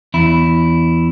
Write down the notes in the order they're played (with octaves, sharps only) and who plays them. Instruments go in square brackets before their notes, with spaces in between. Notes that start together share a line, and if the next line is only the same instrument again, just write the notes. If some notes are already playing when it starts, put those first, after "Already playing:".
[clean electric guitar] E2 E4